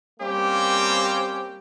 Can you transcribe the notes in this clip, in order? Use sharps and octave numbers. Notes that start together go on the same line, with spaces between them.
G3 A#3 C4 C#4 G4